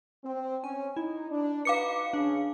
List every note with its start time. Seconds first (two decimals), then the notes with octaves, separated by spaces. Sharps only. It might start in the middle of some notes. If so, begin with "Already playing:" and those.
0.24 C4
0.64 C#4 G#5
0.97 D#4 E4
1.31 D4
1.65 D#4 F#4 B4 F5 D6 C#7
2.13 C#3 D4